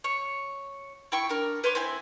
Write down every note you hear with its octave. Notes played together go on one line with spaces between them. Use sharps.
C#5
E4 G5 C#6
D4 A#4
B4 C#5 C6 D6
C4 E4 G#5